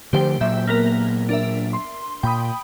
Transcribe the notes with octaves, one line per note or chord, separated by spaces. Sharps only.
D3 F3 A3 G4 C5 G5
A#2 F#3 E5 G6
A#3 B3 A#4
D4 A#4 E5
C6
A#2 G5 B5 D#6